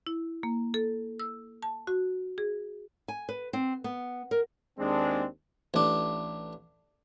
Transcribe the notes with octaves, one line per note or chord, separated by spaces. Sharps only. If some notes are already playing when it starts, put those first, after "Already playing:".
E4
A#3
A4
E6
A5
F#4
G#4
G#5
B4
C4
B3
A#4
D#2 G#3 C4 D4
A1 D4